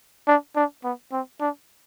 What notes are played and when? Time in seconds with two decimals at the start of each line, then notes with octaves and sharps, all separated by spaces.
0.28 D4
0.56 D4
0.84 B3
1.12 C4
1.41 D4